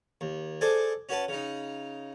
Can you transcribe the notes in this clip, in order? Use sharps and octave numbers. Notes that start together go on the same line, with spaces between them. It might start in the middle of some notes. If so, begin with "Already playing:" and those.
D#2
G#4 A4 C5 D5 G#5
C#4 F#4 B4 A5
C#3 D#4